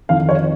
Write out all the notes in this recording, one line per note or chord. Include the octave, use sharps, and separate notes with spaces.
F2 D#3 F5
C#5